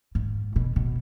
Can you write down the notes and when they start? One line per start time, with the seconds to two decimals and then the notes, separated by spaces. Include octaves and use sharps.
0.15 G#2
0.56 B2
0.76 B2